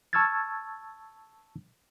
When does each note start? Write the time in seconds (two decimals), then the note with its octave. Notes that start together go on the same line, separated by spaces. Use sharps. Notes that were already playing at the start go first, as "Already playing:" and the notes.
0.13 A5 C#6 E6 F6 G#6 A6